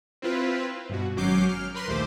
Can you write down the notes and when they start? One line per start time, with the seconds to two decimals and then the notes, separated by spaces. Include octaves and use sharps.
0.22 C4 E4 F4 B4
0.90 G2 B2 F#4
1.16 G#1 F#3 C#4 D6 G6 C7
1.49 F6
1.74 A#4 B4 B5 C6
1.88 A#1 D#2 A3 C5 D6